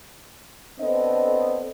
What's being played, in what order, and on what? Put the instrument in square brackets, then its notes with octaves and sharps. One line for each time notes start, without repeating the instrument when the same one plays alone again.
[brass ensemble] B3 C4 D4 A4 C5 D#5